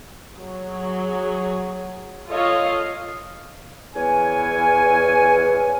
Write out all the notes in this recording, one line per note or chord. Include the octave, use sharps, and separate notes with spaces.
F#3 G#4
F4 A4 C#5 D#5 F5
E2 C#5 G#5